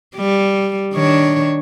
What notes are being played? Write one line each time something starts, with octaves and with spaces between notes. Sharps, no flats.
G3
D#3 D4 C#5